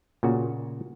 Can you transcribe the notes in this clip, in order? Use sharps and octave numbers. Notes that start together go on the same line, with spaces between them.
A#2 C#3 F#4